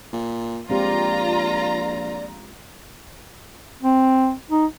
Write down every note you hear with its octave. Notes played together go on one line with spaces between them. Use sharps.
A#2
A#1 G#3 C4 F4 G4 D5 A#5
C4
D#4